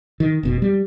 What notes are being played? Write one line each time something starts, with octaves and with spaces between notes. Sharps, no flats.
D#3
F1 B2
G3